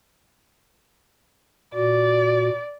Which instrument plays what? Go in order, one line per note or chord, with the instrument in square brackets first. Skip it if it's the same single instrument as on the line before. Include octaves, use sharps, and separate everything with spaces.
[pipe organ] A#2 F#4 [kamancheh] D5